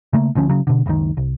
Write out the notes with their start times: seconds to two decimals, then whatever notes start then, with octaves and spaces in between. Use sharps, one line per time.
0.13 C#3 A3 A#3
0.35 D2 D3 F3 C#4
0.49 C#3 F#3
0.67 B2 D3
0.86 F#1 C#2 D#3
1.17 C2